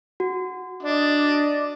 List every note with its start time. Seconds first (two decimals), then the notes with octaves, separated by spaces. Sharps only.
0.20 F#4
0.82 D4 D5 D#5